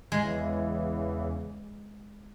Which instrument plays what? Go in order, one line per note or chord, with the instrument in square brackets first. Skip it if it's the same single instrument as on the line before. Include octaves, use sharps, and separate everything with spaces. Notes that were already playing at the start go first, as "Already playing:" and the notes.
[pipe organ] E2 C#3 E3 [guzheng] G#3